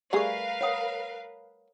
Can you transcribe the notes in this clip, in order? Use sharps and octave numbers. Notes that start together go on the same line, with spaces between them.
G3 A3 G#4 A#4 B4 D5 F5 C#6
C#5 F#5 D#6